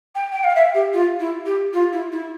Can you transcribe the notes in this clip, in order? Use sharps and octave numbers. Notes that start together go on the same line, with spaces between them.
G5
G5
F5
E5
G4
F4
E4
G4
F4
E4
E4